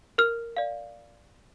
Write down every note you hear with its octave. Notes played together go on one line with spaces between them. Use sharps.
A#4 F6
D5 F5